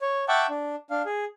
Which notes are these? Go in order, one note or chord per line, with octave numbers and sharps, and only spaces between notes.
C#5
E5 F#5 G5 A5 C#6 D6
D4
D4 F5
G#4